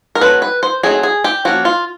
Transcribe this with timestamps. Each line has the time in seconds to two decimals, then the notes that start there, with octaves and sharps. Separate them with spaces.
0.15 A#4
0.21 F#3 A3 C4 B4
0.42 B4
0.63 C5
0.83 F#3 A3 C4 D#4 G#4
1.03 G#4
1.24 G4
1.45 F3 A#3 C#4 F#4
1.65 F4